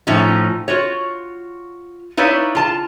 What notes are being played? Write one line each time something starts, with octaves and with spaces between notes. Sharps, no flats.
A2 F3 C#4 D#4
F4 F#4 C#5
D#4 E4 B4 C#5 D5 F5
F4 A5